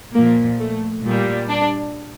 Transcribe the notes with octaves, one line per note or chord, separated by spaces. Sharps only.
A#2 F3 A#3
A3
A#2 G3
D4